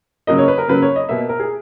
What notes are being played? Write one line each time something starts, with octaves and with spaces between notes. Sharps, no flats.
C#3 F#3 A#3 D#5
C#5
B4
A#4
C#3 F#3 A#3 B4
C#5
D#5
B2 A#3 E5
A#4
G#4